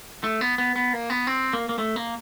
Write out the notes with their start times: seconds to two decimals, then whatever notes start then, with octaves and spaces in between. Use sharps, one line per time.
0.24 A3
0.41 B3
0.58 B3
0.76 B3
0.93 A#3
1.10 B3
1.27 C4
1.53 A#3
1.69 A#3
1.79 A3
1.96 A#3